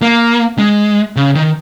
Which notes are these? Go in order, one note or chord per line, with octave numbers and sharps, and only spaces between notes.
A#3
G#3
C#3
D#3